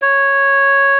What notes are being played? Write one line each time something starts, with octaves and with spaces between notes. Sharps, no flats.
C#5